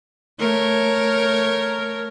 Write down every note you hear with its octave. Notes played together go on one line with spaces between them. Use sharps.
A3 A#4 C#5